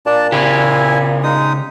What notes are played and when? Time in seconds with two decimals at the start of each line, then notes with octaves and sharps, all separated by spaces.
0.06 A#2 D4 D5 A5
0.32 C#3 E4 G4 G#5
1.23 G#3 D#4 D#6